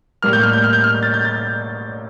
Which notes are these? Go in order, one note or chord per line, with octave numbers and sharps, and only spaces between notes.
A2 G3 A#3 F6
G6
F6
G6
F6
G6
F6
A6
G6
A6